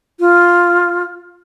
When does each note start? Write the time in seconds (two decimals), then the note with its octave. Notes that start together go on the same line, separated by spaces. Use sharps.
0.20 F4